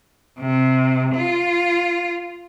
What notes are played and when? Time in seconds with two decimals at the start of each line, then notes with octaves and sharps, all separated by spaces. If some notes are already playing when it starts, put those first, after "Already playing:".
0.40 C3
1.16 F4